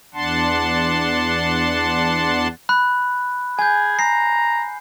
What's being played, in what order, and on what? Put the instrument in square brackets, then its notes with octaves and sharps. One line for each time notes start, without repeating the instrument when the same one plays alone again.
[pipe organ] E2 D4 F#5 A5 C6
[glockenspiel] B5 F#6
[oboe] G#4 [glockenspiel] G#5 G6
[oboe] A#5 [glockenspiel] C7